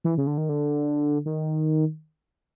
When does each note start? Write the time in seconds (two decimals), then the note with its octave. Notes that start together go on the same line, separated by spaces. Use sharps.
0.04 E3
0.18 C#3
0.27 D3
0.38 D#3
0.49 D3
1.25 D#3